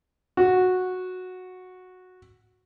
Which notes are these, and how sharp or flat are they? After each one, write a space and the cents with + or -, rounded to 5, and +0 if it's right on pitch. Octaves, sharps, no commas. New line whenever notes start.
F#4 -10